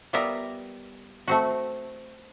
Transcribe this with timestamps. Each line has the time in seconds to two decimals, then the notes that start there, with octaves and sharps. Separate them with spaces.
0.13 G3 B3 F4 A#4 E5
1.28 A3 C4 F#4